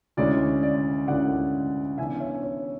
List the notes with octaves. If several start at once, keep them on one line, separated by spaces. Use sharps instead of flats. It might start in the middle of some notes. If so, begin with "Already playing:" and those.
D2 C#3 G#3 C#4 E4 D5
D5
D2 C#3 G#3 C#4 E4 D5 F#5
C#3 E3 B3 D4 E5 G#5
C#5 E5
C#5